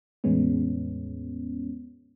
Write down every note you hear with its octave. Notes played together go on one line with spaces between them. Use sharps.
E2 A2 G#3 B3 C#4